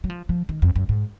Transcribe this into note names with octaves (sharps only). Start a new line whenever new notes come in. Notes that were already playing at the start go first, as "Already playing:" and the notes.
F#3
F3
F3
D#3
F2
F#2
G#2